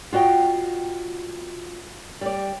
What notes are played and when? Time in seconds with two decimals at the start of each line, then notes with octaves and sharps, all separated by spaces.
0.13 F4 F#4 D#5 G5
2.21 G3 D5